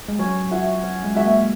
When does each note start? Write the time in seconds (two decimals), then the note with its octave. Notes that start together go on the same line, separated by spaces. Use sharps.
0.08 G#3
0.19 F#3 C#4
0.51 F#4 C#5 E5
0.83 C#4
1.04 G#3
1.15 G#3 F#4 C#5 E5
1.25 A#3